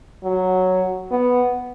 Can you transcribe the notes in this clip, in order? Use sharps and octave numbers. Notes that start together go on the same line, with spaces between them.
F#3
B3